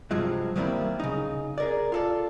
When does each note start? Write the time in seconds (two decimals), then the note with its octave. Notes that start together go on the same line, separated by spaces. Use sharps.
0.11 G2 C3 F3 F#3 G#3
0.56 D#3 F#3 G3 A#3 C4 E4
1.00 C#3 D#4
1.58 G#4 A#4 D5
1.92 F4 A4 D5